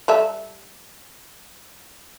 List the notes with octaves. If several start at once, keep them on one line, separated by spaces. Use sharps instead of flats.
G3 A4 E5